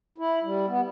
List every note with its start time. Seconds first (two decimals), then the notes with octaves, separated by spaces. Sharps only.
0.18 E4
0.43 G3
0.68 B3